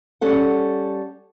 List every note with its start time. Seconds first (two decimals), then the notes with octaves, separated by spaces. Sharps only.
0.21 G3 C#4 A4 F#5